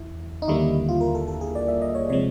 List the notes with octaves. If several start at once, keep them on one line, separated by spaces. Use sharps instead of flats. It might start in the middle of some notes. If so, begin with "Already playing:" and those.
Already playing: E2 E4
D#4
D#2 D3 G3 A#3 E4
F4
A#4
A4
A4
G#4
D5
E5
D#5
C#5
C3 F3 G#3 C#5